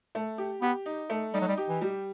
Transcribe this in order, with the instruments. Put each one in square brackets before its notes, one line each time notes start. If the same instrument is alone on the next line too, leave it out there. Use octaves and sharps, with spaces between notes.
[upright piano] A3
G4
[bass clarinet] B3 [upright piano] G4
[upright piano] D#4
A3
[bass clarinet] G3 [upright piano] D#4
[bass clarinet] F#3
G3
[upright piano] G4
[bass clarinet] E3
[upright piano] G3